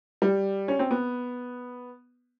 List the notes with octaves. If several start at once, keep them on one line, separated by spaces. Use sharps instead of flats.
G3
C#4
C4
B3